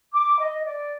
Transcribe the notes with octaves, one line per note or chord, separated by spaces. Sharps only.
D6
D#5
D5